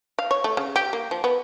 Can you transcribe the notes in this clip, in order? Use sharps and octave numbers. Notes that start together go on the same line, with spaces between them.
F5
C#5
A3
C#3
G4
A#3
F3
B3